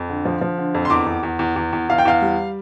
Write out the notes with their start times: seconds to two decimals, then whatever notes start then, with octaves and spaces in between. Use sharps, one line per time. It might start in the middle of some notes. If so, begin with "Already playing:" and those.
Already playing: F2
0.09 D3
0.25 F3
0.41 F3
0.58 D3
0.75 F2
0.85 C6
0.90 E2 D6
1.06 E2
1.23 E2
1.39 E2
1.56 E2
1.73 E2
1.89 E2 F5
1.98 G5
2.05 E2 F5
2.22 G3